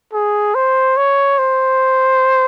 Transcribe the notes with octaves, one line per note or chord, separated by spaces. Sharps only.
G#4
C5
C#5
C5